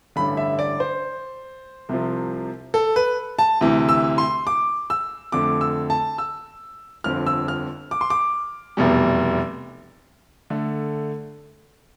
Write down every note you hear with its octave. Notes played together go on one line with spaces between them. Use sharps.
A1 G2 D3 B5
E5
D5
C5
C2 C3 F3
A4
B4
A5
D2 C3 E3
E6
C6
D6
E6
F2 D3 A3 D6
E6
A5
E6
G1 F2 D3 F3 F6
E6
F6
D6
C6
D6
F1 E2 B2 G3
D3 A3